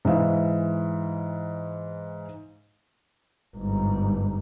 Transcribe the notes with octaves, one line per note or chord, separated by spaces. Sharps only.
G#2 E3 E5 F5
G1 G#2